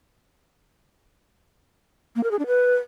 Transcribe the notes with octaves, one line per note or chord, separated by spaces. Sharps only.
A#3
A#4
G#4
D4
B4